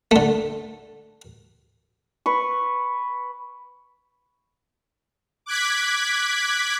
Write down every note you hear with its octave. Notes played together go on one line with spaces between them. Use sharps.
D3 A3
B4 C#6
D6 F#6 G#6 B6